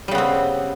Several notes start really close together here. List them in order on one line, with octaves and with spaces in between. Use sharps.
G3 C#3 B3 C4